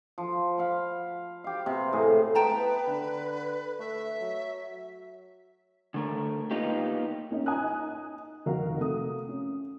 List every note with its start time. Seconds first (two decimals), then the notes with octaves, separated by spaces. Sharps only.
0.18 F3
0.58 F5 F#5 B5
1.44 G4 F5
1.66 C3 B3
1.93 A2 G#4 A#5
2.35 B4 G5 A5 A#5
2.53 B3
2.87 D3
3.79 A3 E5
4.21 F#3
5.94 D3 A3 A#4
6.51 A#3 B3 D#4 F4 G4
7.31 A#3 C#4 D#4
7.46 G#5 A#5 D#6 F#6
7.63 D#4
8.46 F1 D#3 F#4 A#4 F5
8.79 C3 A3 D#6
9.29 C#4